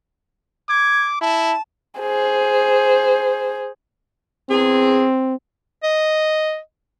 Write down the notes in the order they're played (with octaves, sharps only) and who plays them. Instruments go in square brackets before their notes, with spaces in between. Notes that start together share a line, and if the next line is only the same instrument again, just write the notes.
[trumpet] D6 [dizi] G#6
[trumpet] E4 [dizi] A5
[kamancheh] G#4 C5
[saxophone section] E2 G#4 [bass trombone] C4
[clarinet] D#5